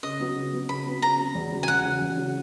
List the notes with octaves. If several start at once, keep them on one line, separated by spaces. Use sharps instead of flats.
C#3 D#5
F#3 B3
C#3
F#3 B3
C#3 B5
F#3 B3
C#3 A#5
F#3 B3
E2
C#3 F#3
G#5
E2 F#5
C#3 F#3
E2
C#3 F#3